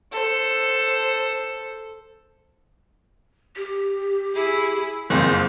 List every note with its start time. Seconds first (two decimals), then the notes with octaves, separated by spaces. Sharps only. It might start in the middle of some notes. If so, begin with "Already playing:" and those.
0.12 A4 C5
3.56 G4
4.34 E4 G#4
5.10 F#1 F2 A#3 F4 G#4